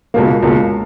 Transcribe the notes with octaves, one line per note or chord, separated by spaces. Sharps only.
C#2 B2 A#3
C#2 B2 A#3